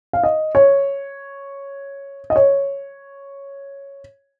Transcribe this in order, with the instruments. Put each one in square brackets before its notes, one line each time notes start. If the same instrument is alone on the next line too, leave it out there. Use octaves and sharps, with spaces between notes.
[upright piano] F5
D#5
C#5
D#5
C#5